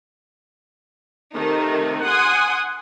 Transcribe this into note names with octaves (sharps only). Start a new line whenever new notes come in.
C3 D#3 A3 D#4
F#5 G#5 C6 D#6